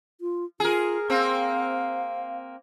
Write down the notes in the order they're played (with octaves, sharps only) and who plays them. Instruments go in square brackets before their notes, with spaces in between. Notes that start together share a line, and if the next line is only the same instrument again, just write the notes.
[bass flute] F4
[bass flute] F4 [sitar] G#4 A#4
[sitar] A#3 C4 [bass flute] F5